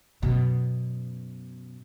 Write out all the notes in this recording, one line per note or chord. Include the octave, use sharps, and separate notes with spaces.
F#2 B2